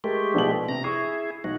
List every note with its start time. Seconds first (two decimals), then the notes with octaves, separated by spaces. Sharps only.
0.04 G#3 A3 G4 A#4
0.34 A#1 B2 F#7
0.69 C3 A#5
0.84 E4 G#4 C#6
1.44 B1 F#4